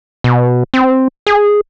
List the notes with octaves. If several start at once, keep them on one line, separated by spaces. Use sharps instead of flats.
B2
C4
G#4